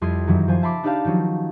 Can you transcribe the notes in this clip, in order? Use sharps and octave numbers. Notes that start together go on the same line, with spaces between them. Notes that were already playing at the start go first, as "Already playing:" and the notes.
F2 G3 E4 C6 D#6 G#6
F#2 D#3 E3 F#3
F3 C5 G#5
E5 A5 B5 C6 D6
D4 D#4 G4 D5 F5 A5
D#3 F3 F#3 C#4